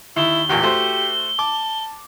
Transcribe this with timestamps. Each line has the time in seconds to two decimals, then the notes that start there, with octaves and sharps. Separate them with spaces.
0.17 D#2 E4 G7
0.49 A1 E2 A#2 G4
0.63 A3 F#4 C5
1.39 A5 D6